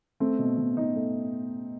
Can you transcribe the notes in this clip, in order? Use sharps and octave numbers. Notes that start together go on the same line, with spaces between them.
A3 C4
B2
B2
B2 D#4
A3